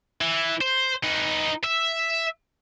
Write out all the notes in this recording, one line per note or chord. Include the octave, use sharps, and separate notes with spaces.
E3
C5
D#4 B4
E5